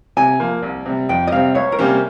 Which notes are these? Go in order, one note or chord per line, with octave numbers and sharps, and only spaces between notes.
C3 G#5
F3 A#3
C2
C3 G3
F2 G5
D#5
C3 G3 C4 F5
C#2 C#5
A#4
C3 G3 A#3 C#4 C5